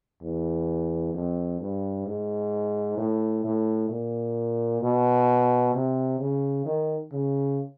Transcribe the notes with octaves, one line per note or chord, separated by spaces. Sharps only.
E2
F2
G2
G#2
A2
A2
A#2
B2
C3
C#3
D#3
C#3